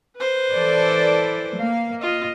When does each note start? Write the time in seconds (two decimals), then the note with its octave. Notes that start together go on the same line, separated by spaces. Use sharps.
0.17 B4 C5
0.52 E3 A4 D5
1.57 A#3 F5
2.01 F4 D#5